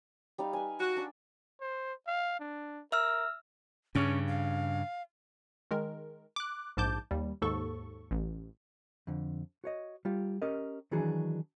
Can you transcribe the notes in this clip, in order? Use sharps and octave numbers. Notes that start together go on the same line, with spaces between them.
G3 D#4 F5
B4 G#5
F#4
D4 E6
C5
F5
D4
A#4 E5 E6 F6
G2 C#3 C#4
F5
D#3 G#3 A#4
D6 F#6
A#1 G#2 A5 D6 G6
D#2 G3
D#2 G#2 A4 C#6
A1
F2 D3
F#4 C#5 D#5
G3 F4 G4
C#4 G4 A#4 D#5
D#3 E3 F#3 D4 F#4 G#4